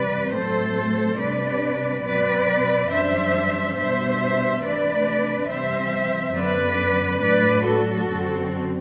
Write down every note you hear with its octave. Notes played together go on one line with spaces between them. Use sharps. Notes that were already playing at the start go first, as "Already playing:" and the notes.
Already playing: C3 E3 G3 B4 D5
A2 F#3 A3 C4 A4 C5
C3 G3 D4 B4 D5
B2 F#3 C4 B4 D5
F#2 E3 G3 D4 C5 E5
B2 G3 B3 D4 C5 E5
C3 E3 A3 D4 B4 D5
C3 E3 G3 C4 C5 E5
F#2 D3 F#3 B3 B4 D5
A2 F#3 A3 D4 B4 D5
F#4 A4
F#2 D3 F#3 C4